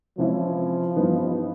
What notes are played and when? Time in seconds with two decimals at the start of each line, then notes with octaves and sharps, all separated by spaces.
0.18 C3 E3 F3 G#3 C#4 E4
0.96 G2 E3 G3 B3 D#4